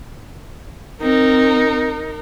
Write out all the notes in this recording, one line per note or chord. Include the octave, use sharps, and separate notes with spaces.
C4 D#4 A#4